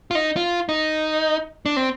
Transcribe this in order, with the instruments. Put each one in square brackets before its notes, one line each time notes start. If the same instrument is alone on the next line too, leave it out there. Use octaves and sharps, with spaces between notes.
[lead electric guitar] F4
D#4
F4
D#4
D4
C4